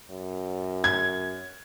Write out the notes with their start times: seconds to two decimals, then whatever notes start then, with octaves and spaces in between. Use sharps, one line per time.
0.11 F#2
0.84 G#6